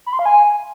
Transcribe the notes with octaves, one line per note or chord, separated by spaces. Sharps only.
B5
C6
F5
G#5